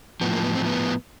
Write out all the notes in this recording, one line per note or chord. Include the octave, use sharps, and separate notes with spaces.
A2 F3 B3
A#3
B3
C4
B3